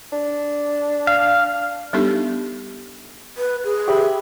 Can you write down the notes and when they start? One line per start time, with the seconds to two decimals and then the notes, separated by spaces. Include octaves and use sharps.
0.12 D4
1.07 F5
1.93 G3 B3 D4 D#4 G4 A4
3.37 B4
3.64 G#4
3.88 G4 E5 B5